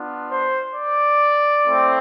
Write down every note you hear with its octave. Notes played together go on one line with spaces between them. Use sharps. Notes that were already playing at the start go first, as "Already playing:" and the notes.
Already playing: B3 D4 F4
C5
D5
A3 C4 E4